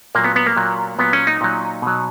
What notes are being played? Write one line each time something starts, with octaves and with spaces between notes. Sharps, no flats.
A#2 F#3 A#3
B3
B3
A#3
A#2 F#3
A#2 F#3 B3
C#4
D#4
A#2 F#3
B2 F#3